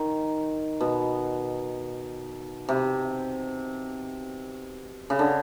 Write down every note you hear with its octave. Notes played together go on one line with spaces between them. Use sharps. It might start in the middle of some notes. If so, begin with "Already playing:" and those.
Already playing: D#3
B2
C3
C#3
D3